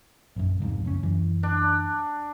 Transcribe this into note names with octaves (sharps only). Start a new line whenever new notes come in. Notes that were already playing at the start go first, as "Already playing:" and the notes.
A#1 F#2
C2 F2 G#2
F#1 C#4
F#2 E3
D4